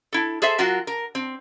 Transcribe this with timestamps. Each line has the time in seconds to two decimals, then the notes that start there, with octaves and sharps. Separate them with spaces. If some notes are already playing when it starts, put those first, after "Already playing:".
0.13 E4 A4
0.42 G#4 A4 C5 E5
0.58 F#3 F4 F#4 A#4
0.87 A#4
1.15 C4